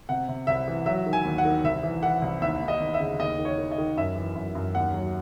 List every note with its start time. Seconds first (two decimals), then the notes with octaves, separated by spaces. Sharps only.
0.09 C3 F#5
0.29 C3
0.47 C2 E5
0.68 E3
0.86 F#3 E5
1.06 D#3
1.13 G#5
1.25 D#2
1.38 F#5
1.45 D#3
1.64 C2 E5
1.83 E3
2.03 E3 F#5
2.22 C2
2.41 D#2 E5
2.61 D#2
2.68 D#5
2.80 D#2
2.94 E5
3.00 C#3
3.19 D#2 D#5
3.38 D#3
3.45 C#5
3.58 D#3
3.71 D#5
3.78 D#3
3.97 F#2 E5
4.16 E3
4.35 F#2
4.55 F#2
4.75 D#2 F#5
4.94 F#3